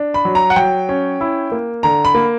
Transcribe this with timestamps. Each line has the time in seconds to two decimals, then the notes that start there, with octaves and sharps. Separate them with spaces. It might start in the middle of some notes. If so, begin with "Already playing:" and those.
Already playing: D4
0.14 B5
0.25 F#3
0.35 A#5
0.50 F#5
0.56 F#3 G5
0.89 C#4
1.21 E4
1.52 A#3
1.83 D3 A#5
2.05 B5
2.14 A#3